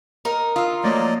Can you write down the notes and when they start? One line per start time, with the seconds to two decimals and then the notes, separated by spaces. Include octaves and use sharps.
0.25 D#4 A#4
0.56 F4 D#6 E6
0.84 F3 F#3 A3 A#3 D5 D#5